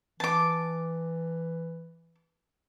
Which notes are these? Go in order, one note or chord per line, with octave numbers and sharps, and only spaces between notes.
E3 A5 D6